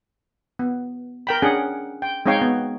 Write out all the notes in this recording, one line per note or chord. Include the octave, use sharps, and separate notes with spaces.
B3
A#4 G5 B5
C#4 D4 G#4 F#5
G5
G#3 C4 D#4 C#5 F5 G5
B3